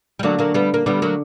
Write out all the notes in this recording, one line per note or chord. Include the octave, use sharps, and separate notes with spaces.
G3
D3 F#3 A#3
F#3 A#3
G3 B3
A#3
D3 G3 B3
F#3 A#3